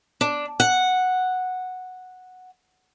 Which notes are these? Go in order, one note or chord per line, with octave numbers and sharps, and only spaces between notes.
D4
F#5